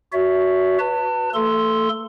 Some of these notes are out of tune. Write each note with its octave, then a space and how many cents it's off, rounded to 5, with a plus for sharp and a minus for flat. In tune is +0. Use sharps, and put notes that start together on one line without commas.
F#4 +0 C#5 +40 E5 +0
B4 +0 A5 +35
A3 +35 A4 +0 C6 +0